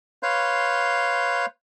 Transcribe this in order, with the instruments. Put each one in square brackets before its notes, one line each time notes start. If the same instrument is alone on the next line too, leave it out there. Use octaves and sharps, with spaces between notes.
[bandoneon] B4 C#5 F5 C6 G6